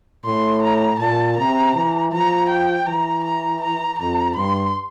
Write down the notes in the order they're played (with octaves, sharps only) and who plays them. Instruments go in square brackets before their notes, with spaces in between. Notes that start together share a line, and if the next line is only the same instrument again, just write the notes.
[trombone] A2 [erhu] C6
[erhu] A#5
[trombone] A#2 [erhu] A5
[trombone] C3 [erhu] A#5
[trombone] E3
[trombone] F3 [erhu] A#5
[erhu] G5
[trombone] E3 [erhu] A#5
[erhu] A#5
A#5
[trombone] F2 [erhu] A#5
[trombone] G2 [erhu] C6